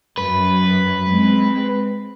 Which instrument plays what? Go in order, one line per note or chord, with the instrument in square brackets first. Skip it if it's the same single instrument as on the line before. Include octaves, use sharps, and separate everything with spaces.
[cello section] F#2 [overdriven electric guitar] B4
[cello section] G#3 C4